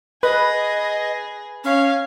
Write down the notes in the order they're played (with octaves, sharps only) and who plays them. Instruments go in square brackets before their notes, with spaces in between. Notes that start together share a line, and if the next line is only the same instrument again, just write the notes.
[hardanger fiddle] G#4 [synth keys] B4 [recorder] D#5
[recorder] C#4 [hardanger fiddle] C#5 F5